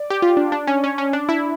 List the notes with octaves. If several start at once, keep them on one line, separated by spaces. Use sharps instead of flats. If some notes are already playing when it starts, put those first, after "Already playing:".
Already playing: D5
G4
F4
D4
D4
C#4
C#4
C#4
D4
E4